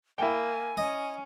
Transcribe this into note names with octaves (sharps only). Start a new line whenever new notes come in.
A#3 E4 G5 G#5
C#4 D#5